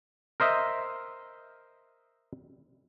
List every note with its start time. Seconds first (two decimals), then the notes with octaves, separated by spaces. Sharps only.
0.40 A#4 C5 D#5 E5